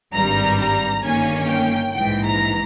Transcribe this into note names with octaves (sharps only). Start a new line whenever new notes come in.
G#1 G2 G3 A#5
A#5
G1 G2 D#3 A#3 C#4 G#5
G5
A#1 G#2 E3 G5
A#5